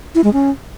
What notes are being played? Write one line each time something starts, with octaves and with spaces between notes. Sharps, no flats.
E4
G#3
C#4